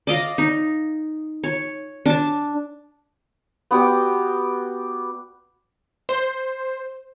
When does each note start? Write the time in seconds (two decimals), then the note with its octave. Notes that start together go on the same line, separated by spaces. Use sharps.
0.07 D5 D#5 F5
0.38 D#4
1.44 C#5
2.06 D4 A5
3.71 B3 F#4 G4 D5
6.09 C5